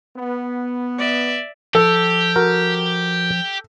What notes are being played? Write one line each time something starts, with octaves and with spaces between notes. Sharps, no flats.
B3
D5 E5
F3 G4 A4
F#4 A#4